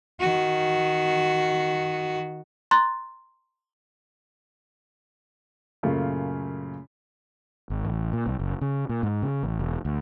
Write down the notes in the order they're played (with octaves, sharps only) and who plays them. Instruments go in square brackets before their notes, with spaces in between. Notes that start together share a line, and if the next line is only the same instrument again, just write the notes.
[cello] D#3 F#4
[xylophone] A#5 C6 F#6 A6
[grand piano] F#2 A#2 C#3 A3 A#3 F4
[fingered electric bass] G#1
A1
A#2
C2
F#1
C#3
A#2
G#2
C#3
A1
E1
D2